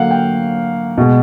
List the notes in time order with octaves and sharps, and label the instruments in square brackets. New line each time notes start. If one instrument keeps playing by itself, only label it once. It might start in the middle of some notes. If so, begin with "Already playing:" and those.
Already playing: [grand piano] D3 F#3 A#3 F5 F#5
G5
B2 G#3